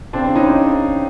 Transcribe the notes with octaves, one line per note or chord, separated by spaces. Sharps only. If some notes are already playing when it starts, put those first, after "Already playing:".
C#3 C4 D4
C#3
C#4 D#4